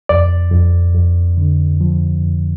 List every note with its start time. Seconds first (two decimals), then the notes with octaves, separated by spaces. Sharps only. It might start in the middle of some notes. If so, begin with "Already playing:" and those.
0.09 F2 D5
0.52 F2
0.95 F2
1.37 D3
1.81 F3
2.23 F2